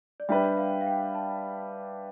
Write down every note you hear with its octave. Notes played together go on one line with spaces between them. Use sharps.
D5
G3 D4 G4 B4 E5
F5
F5
G5
A5